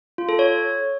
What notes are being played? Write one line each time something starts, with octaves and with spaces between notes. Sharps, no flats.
F4
A4
C#5